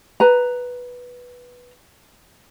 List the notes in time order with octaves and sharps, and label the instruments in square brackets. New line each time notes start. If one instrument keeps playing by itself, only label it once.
[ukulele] B4 A#5